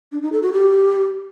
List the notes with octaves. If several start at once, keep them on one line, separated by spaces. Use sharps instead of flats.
D4
D#4
A4
F#4
G4